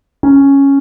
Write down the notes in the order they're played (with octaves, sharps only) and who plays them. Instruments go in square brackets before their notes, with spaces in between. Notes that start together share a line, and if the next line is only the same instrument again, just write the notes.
[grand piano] C#4